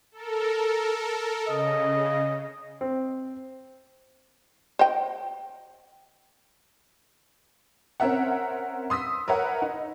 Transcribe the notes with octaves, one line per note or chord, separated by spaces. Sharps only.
A4 A#4
C#3 D#5
C4
C5 D#5 G5
C4 C#4 A#4 E5 F#5
C6 D#6 E6 B6
A#4 B4 C#5 E5 F#5
D#4